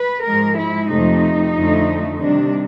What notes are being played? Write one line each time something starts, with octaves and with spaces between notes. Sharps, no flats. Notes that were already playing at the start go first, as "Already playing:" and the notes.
Already playing: B4
G#2 F3 G#3 A#4
E4
F2 C3 F3 A3 D#4
F2 D3 F3 A3
C3 D#3 G3 D4